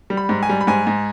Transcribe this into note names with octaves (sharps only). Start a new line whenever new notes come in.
G3
B5
G#2
G#5
G3
B5
G#2 G#5
G#2